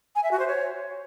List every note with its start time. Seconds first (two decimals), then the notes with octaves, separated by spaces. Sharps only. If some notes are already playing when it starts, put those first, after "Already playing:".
0.15 G#5
0.23 E5
0.31 F#4
0.39 C5
0.47 C#5